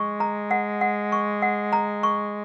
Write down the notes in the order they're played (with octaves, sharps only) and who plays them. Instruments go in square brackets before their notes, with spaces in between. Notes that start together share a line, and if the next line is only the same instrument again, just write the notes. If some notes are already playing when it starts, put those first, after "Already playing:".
Already playing: [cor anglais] G#3 [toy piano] C#6
[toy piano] A#5
F#5
F#5
C#6
F#5
A#5
C#6